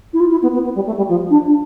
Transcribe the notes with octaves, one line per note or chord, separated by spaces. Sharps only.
E4
F4
E4
B3
B3
B3
G3
A3
G3
F3
D4